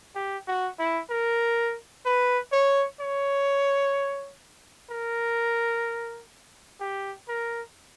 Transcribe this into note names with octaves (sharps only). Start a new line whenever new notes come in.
G4
F#4
E4
A#4
B4
C#5
C#5
A#4
G4
A#4